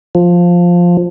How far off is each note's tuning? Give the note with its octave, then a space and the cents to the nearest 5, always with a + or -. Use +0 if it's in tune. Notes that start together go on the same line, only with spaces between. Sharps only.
F3 +5